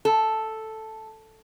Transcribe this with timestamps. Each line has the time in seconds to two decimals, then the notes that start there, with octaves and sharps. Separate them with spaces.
0.05 A4